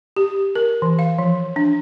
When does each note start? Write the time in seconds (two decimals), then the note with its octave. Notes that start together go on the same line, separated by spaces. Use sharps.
0.16 G4
0.55 A#4
0.82 E3
0.99 F5
1.18 F3
1.56 D4